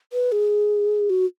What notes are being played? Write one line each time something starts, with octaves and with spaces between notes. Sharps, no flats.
B4
G#4
F#4